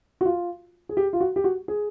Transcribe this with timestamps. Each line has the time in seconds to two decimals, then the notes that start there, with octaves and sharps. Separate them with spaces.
0.21 F#4
0.25 F4
0.89 G#4
0.97 G4
1.13 F4
1.20 F#4
1.36 G4
1.44 F#4
1.68 G#4